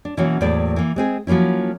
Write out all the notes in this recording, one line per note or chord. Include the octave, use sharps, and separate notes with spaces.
D4
B2 E3 F#3 A#3 C#4 F#4
E2 A2 F#3 A#3 C5 D5
E3 A#3
G#3 C4 G#4
F3 F#3 A#3 C#4 E4